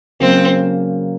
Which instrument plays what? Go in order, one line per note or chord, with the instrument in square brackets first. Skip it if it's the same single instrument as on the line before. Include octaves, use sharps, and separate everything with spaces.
[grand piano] C#3 F#3 A#3 C#4 [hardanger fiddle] C4